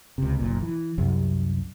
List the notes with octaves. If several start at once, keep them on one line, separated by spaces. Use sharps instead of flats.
C#2 C3
F#1 B1 A#2
E3
C2 F#2